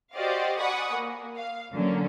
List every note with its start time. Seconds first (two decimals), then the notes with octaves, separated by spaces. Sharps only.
0.15 F#4 G4 C5 D5 D#5 F5
0.59 D5 F#5 G#5 B5 C#6 D#6
0.94 A#3
1.37 F5
1.73 D3 F#3 A#3 C#4